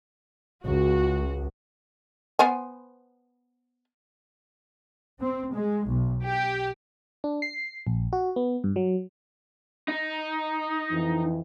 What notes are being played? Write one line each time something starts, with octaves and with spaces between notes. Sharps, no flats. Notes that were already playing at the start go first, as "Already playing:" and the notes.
C#2 F#4
B3 C5 G#5
C4
G#3
B1
G4
D4
C7
A#1
F#4
B3
G2
F#3
D#4
F2 E3